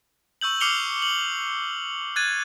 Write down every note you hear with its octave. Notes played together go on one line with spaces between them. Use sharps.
C#6 E6 G6 F#7
D6 F6 C7 C#7 F7 G7
F#7
F#6 G#6 A6 D#7